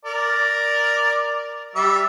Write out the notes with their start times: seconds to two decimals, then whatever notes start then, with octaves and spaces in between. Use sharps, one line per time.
0.05 A#4 D5
1.75 G3 E5 D6